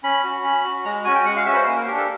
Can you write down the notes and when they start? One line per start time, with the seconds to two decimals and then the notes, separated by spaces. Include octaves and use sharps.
0.04 C#4 B5
0.24 F#4
0.44 C#4
0.64 F#4
0.85 G#3 A#5
1.05 C#4 F#4 G#5
1.15 G5
1.25 G#3 F#5
1.36 F5
1.46 C#4 F#4 E5
1.53 B4
1.56 C5
1.66 A#3 B4
1.76 A#4
1.87 D4 G4 A#4
1.97 A4